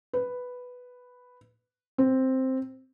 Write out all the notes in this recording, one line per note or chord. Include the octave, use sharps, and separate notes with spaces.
B4
C4